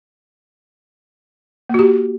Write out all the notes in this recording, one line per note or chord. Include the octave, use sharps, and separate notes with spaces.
A#3 F#4 G4